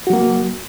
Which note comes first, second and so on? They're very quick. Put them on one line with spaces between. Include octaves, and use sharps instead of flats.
F#4 F#3 A#3